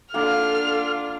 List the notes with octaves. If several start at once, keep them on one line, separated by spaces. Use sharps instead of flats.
A#3 D4 F4 A4 F5 F#5 F6